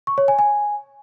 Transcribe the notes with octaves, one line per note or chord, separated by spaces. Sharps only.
C#6
C#5
G#5
G#5